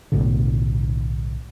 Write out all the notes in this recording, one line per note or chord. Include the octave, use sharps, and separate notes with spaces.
B1 A2 D3